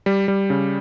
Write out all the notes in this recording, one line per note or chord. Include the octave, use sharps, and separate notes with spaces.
G3
G3
C#3